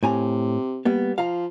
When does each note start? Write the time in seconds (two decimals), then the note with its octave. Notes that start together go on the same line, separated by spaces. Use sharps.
0.03 A2 C3 G#5 A#5
0.85 G3 A#3 B3
1.18 F3 F5 A#5